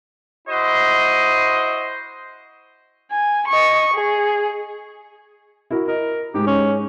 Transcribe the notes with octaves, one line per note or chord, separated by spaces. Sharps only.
E4 F#4 C5 D#5
G#5
D#5 C#6
G#4
E4 F#4 A#4
A#4 D#5
G#2 G#3 G4
C#4